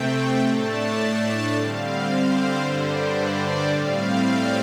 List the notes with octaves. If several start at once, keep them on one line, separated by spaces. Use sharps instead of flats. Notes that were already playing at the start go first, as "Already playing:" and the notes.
Already playing: C3 A3 C4 G5
A2 A3 D4 A5
D3 G3 C4 F5
C5
G2 D3 G3 D4
D5
A2 G3 C4 F5
G5